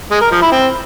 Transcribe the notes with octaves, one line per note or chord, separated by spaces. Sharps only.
G#3
A#4
F3
E4
C4